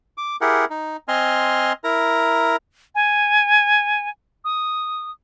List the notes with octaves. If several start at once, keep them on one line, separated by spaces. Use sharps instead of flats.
D6
E4 G4 G#4 A#4 F#5
D#4
C4 D#5 G#5 C6 F6
E4 A#4 A#5
G#5
D#6